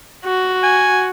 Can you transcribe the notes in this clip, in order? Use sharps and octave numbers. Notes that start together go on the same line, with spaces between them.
F#4
G#5